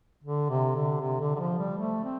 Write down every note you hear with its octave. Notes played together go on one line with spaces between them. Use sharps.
D3
C3
D3
C3
D3
D3
F3
G3
A3
C4